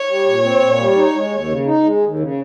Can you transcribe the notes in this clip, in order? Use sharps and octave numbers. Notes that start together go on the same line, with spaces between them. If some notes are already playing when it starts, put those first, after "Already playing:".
Already playing: C#5
G3
A#2
C4
A#2
G3
D#4
G#3
D#2
C#3
D#4
G#3
D#2
C#3